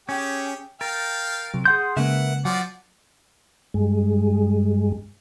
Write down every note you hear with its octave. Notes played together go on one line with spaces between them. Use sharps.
C#4 G4 G#4 G5
A#4 F5 G5 A6
C3 F#3
G#4 F#5 C6 G6
C#3 G#3 A#3 A#4 B4 E5 F#5
F3 F#3 D5 F#5
G2 G#3